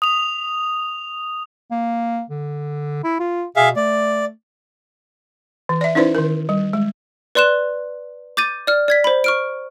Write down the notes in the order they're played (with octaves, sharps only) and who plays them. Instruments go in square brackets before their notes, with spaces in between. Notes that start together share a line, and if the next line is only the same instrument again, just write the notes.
[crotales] D#6 F7
[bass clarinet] A#3
D3
E4
F4
[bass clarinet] B2 [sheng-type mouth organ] G#4 E5 F5
[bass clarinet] A3 [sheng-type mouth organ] D5
[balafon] E3
D5 E5
C#4 D#4 E4 B4 C5 D5
D#3 A#4
G3
G#3
[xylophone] B4 D5 C6 F#6 E7
D6 G6 A6 D#7
D5 F6
D5 G#6 B6
C5 B5
C#6 F6 D7